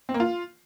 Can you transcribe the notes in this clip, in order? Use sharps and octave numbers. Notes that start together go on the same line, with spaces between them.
C4
A#3
F4